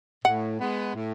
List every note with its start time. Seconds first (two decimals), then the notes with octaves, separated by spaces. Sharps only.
0.25 A2 F#5
0.60 G#3 B3
0.95 A2